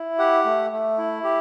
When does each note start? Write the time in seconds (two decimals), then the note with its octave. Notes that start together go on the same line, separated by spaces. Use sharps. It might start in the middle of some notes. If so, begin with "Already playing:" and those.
Already playing: E4
0.19 G4 F#5
0.45 A3
0.72 A3
0.98 E4
1.24 G4